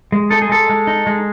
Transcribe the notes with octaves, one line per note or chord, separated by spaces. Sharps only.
G#3
D#4 A4
G#4
G#3 A4
G#3
D#4
G#3